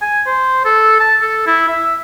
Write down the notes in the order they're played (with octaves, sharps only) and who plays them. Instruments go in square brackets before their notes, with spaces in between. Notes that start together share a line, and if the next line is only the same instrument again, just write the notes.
[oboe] G#5
C5
A4
A5
A4
E4
E5